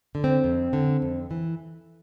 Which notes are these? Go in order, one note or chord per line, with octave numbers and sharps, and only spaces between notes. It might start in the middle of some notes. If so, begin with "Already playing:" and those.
D3
C4
F2
D3
F2
E3